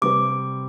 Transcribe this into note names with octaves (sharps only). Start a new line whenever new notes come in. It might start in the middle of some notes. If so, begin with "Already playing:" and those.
C3 G3 C4 D6